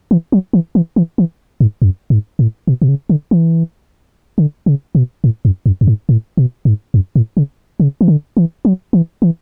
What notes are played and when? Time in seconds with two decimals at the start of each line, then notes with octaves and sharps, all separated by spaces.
0.11 E3
0.32 F#3
0.53 E3
0.75 E3
0.96 E3
1.18 E3
1.60 G#2
1.82 F#2
2.10 G#2
2.39 A2
2.67 B2
2.82 B2
2.88 C#3
3.09 D3
3.31 E3
4.38 D3
4.66 C#3
4.95 B2
5.24 A2
5.45 F#2
5.66 F#2
5.81 F#2
5.87 G#2
6.09 A2
6.37 B2
6.65 G#2
6.94 F#2
7.16 A2
7.37 C#3
7.80 C#3
8.01 E3
8.08 D3
8.37 E3
8.65 F#3
8.93 E3
9.22 E3